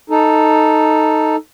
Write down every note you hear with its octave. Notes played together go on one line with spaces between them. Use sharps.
D#4 A4